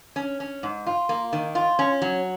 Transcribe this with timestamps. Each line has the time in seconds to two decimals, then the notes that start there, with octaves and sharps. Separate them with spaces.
0.16 C#4
0.40 C#4
0.63 G#2
0.87 F4
1.09 A#3
1.33 D#3
1.55 F4
1.79 C#4
2.02 F#3